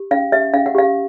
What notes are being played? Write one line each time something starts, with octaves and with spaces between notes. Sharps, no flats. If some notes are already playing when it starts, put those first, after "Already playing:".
Already playing: G4
C#4 F5
G4 E5
C#4 F5
F#5
G4 F5